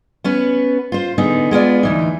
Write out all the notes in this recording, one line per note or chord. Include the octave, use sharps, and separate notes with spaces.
B3 C#4 B4
F4 C5
D3 B3 D#4 G#4
G#3 B3 F4 D5
D2 E3 D#4